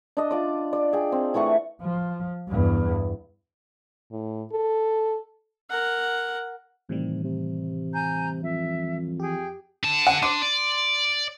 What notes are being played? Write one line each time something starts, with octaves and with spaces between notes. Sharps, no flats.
D4 D#5
F4 D5 D6
D5
G#4 G5
C4
E3 A3 F#5 C#6
F3
E2 G2
A2
A4
A#4 F#5
A2 C3 D#3 E3 G3
C3
G#5 A#5 G6
F2 E5
G4 G#4 G5
D3 A5
F#5
D4 C6 D6 D#7
D5